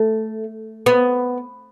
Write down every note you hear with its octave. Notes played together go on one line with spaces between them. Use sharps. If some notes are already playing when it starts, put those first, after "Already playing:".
Already playing: A3
B3